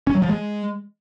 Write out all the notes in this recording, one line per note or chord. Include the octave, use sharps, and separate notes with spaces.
C#4
F#3
F3
G#3